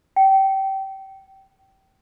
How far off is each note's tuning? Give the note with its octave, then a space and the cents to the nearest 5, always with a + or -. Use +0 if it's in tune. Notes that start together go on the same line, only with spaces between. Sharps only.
G5 -25